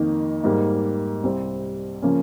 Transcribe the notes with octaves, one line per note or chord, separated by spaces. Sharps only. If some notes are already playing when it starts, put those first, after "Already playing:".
Already playing: F2 D#3 A#3 D#4
G#2 G3 A#3
C2 C3 G3 C4
C#3 F3 A#3 C#4